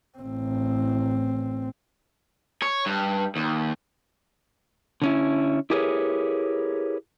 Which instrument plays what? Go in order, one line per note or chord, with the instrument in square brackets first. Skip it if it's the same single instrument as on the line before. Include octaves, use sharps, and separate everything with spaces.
[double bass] A1 C4
[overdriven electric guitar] C#5
G2
D#2
[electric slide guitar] D3 C#4 E4
E4 G4 G#4 A#4 B4 C#5